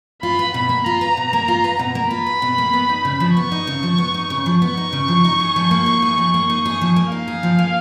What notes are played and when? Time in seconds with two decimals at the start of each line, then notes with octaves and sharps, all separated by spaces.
0.22 F4 B5
0.39 B4
0.54 B2 B5
0.69 A#3
0.85 F4 A#5
1.01 B4
1.17 B2
1.33 A#3
1.48 F4
1.64 B4
1.79 B2
1.95 A#3
2.11 F4 B5
2.27 B4
2.42 B2
2.58 A#3
2.73 B3
2.89 D#4
3.05 C#3
3.20 F3
3.36 B3 C#6
3.52 D#4
3.67 C#3
3.83 F3
3.98 B3
4.14 D#4
4.30 C#3
4.46 F3
4.61 B3 C#6
4.77 D#4
4.93 C#3
5.08 F3
5.25 D#4
5.40 G#4
5.56 F3
5.71 A#3
5.86 D#4
6.02 G#4
6.18 F3
6.34 A#3
6.50 D#4
6.65 G#4
6.81 F3
6.96 A#3
7.12 D#4 F5
7.28 G#4
7.43 F3
7.59 A#3